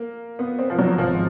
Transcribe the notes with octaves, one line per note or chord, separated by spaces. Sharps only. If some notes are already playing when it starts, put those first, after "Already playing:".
Already playing: A#3
B3
C4
F3
F#3
G#1 F3